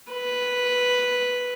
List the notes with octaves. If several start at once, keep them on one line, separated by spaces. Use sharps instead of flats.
B4